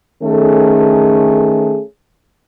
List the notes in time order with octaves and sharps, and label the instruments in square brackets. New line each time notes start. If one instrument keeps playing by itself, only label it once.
[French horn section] D#3 A3 C#4 G#4 A4